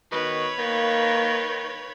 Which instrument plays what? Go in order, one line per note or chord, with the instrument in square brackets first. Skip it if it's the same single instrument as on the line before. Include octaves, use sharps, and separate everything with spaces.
[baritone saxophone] B2 [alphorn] D#3 [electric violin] B4 C#5
[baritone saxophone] D#3 [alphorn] A#3